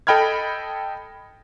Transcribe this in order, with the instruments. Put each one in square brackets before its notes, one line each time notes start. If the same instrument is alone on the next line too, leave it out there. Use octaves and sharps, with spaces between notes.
[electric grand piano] A4 D#5 G5 B5 F6 G#6